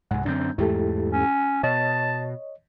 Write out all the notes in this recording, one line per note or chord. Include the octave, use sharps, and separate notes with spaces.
C2 G#2 F#5 G#5
F#2 D3 C4 D4 G6
E2 G#2 A3 E4 G4 A4
C#4
B2 C#5 D#5 A5